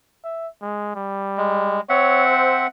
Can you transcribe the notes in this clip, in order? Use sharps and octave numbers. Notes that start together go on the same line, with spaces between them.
E5
G#3
G3
G#3
C4 C#5 E5 F#5
C5